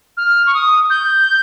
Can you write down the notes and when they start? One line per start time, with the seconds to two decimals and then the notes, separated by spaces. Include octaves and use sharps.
0.17 F6
0.46 C#6
0.54 D#6
0.90 G6